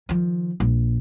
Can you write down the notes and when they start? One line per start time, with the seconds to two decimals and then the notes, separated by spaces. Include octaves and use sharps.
0.09 D#3 F3
0.60 A#1